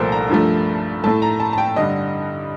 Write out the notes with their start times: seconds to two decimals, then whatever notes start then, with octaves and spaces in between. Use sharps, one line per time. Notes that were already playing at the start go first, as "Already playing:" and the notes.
Already playing: C2 A#2 F3 A3 A4 A#4 C5
0.12 A#5
0.29 G2 F3 A3
1.04 A2 A3 A5
1.22 A#5
1.40 A5
1.53 A5
1.58 G5
1.76 G2 D3 G3 D#5